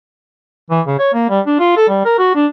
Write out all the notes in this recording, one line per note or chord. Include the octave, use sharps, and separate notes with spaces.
E3
C#3
C#5
A#3
G3
D4
F4
A4
G3
A#4
F#4
D4